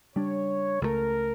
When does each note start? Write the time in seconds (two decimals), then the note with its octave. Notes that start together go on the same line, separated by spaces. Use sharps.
0.15 C#3 G3 D4 C#5
0.81 C#2 C#3 F3 A3 A#4